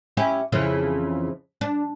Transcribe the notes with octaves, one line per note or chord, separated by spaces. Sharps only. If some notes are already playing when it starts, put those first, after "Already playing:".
C#4 E4 G4
F2 C#3 E3
D4